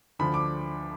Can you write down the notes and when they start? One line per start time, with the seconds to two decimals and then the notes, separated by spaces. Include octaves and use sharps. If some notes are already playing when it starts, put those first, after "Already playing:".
0.19 D2 D3 F3 B5
0.34 D6